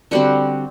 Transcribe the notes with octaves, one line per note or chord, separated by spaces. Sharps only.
D3 G3 C4 F#4 F#5